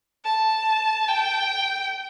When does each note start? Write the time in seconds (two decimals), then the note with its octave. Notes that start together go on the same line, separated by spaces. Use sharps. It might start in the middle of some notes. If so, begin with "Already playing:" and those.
0.25 A5
1.08 G5